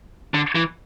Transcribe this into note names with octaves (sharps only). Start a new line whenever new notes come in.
D3
E3